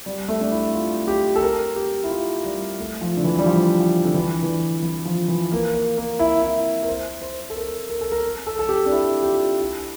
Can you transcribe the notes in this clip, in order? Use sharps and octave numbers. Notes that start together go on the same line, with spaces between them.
G3
A3
D4
E4
F4
G4
A4
A#4
G4
E4
F4
G3
A3
F3
D3
E3
G3
F3
F3
D3
E3
E3
D3
E3
F3
E3
A#3
A#3
A#3
E4
E4
A#4
C5
C5
A4
A#4
A#4
A4
A#4
A4
A4
G4
D4
E4
G4
F4
E4